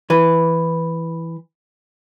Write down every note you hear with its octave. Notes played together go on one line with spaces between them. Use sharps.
E3 B4